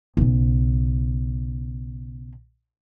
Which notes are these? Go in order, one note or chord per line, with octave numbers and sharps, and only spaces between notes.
B1 C#3